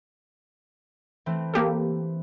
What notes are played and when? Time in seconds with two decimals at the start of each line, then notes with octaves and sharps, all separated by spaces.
1.26 E3 A3 C4
1.54 A#3 G4 A4